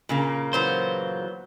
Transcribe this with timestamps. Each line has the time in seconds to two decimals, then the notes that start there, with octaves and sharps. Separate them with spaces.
0.09 A#2 C#3 A#3
0.53 E3 F#3 B3 C5